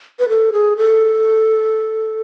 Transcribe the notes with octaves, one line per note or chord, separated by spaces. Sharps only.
B4
A4
G#4
A4